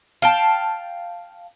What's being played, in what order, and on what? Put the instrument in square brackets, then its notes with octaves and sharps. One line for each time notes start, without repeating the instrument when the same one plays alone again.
[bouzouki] F5 G5 A5